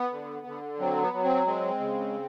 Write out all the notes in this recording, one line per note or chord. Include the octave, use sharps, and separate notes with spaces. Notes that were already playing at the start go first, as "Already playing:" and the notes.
Already playing: B3
D3
D3
F#3 C4
B3
F#3
C4
G#3 C4
C#3